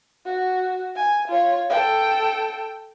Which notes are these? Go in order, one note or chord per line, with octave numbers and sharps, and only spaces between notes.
F#4
G#5
F4 C#5
A4 G5